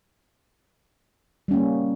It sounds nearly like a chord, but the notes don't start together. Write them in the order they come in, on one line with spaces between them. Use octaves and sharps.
G3 C#4 A#3